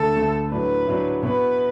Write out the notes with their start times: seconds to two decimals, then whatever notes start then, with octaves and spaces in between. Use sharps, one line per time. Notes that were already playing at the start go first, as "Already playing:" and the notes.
Already playing: D2 D3 A3 A4
0.16 D2 D3 A3
0.51 A2 F#3 D4 B4
0.87 A2 F#3 D4
1.23 B2 B3 E4 B4